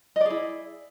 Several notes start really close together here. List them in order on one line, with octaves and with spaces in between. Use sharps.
D#5 D5 G#4 E4